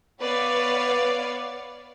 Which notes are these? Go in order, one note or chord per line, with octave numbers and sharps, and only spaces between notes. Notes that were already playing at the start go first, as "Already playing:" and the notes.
B3 B4 C#5 D5 F5